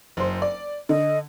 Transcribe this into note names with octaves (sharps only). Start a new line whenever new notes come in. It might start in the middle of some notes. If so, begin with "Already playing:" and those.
F#1 C5
D5
D3 D#5